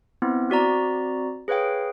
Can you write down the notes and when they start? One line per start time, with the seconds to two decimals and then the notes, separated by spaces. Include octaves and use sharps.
0.22 B3 C4 E4
0.50 C4 F#4 D5 A#5
1.48 G#4 B4 C#5 F5 G5